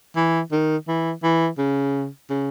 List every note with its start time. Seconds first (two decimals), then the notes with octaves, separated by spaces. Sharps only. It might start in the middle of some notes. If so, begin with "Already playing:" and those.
0.16 E3
0.52 D#3
0.88 E3
1.24 E3
1.58 C#3
2.30 C#3